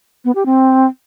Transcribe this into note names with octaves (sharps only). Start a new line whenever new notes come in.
B3
G4
C4